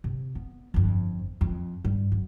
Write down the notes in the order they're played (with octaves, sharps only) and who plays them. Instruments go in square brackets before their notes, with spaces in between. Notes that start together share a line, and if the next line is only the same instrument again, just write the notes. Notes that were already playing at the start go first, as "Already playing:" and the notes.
[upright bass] C3
B3
G1 F2
F2
G2
F#2